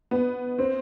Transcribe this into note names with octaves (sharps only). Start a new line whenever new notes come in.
B3
C4